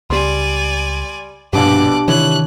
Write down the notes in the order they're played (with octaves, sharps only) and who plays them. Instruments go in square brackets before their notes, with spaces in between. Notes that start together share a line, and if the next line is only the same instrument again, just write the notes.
[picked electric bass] C#2 [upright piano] G3 C6 [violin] D5 G#5
[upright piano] A#1 B2 B3 [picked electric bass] G2 [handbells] D4 G4 [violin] D6 F#6
[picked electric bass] C3 D#3 E3 [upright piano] E4 C#5 [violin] F#6